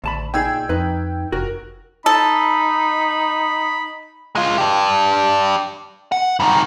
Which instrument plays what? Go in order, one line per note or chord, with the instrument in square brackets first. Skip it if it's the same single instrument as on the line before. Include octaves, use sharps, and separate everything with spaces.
[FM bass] A1 [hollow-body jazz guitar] D2 A5 B5
[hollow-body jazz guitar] A#2 D#4 G#4 [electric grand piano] G5 E6 G#6
[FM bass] F2 [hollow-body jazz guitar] D#4 B4
[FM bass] F1 [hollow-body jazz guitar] F#4 [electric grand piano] A#4
[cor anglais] D#4 [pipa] A4 [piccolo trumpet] B5
[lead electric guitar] G#3 F4
D4 G4
F#5
G2 D#3